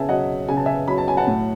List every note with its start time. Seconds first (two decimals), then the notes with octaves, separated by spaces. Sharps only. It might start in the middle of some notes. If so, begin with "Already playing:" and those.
Already playing: C#3 E5 G#5 A5
0.09 F#3 D#5 F#5
0.48 C#3 G#5
0.57 A5
0.66 E5 G#5
0.88 F#3 B5
0.98 A5
1.08 G#5
1.17 F#5 A5
1.27 A2